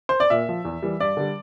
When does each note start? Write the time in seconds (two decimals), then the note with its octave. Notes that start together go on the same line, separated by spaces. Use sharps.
0.09 C5
0.20 D5
0.30 A#2 E5
0.49 F3
0.65 E2
0.82 E3 G3
1.00 G2 D5
1.17 D3 G3